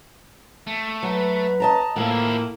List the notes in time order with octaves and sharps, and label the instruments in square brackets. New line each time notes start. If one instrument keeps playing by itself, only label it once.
[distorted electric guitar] A3
[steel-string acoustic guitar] F#3 [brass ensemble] B4
[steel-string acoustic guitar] D#5 A5 A#5
[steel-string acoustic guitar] A2 [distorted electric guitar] F3 E4 [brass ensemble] A3 A#3